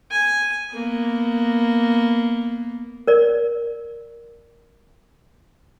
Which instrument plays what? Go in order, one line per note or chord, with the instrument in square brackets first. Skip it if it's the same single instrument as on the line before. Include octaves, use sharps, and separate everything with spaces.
[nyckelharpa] G#5
A#3 B3
[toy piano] A#4 D5